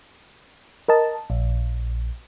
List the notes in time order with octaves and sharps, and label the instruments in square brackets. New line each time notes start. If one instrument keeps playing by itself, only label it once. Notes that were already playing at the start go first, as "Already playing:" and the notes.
[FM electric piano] A#4 D#5 A5
A#1